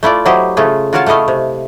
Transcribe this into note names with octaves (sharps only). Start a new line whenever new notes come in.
A3 E4 F4 D5
F#3 E4 G4 C5 D#5
C#3 A3 F4 G#4
F4 F#4 A#4 C#5 F5 A5
A3 C#4 E4 D#5 F5
C3